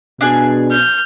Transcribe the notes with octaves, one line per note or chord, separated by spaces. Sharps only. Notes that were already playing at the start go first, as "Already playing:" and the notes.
B2 D4 G#4
F6 G6